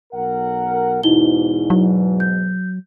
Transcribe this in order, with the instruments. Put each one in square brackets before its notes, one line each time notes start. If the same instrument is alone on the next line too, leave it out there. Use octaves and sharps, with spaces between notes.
[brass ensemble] B1 A#4 F#5
[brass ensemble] E2 G#2 B2 [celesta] D#4 E4 G7
[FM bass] F#3
[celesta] G6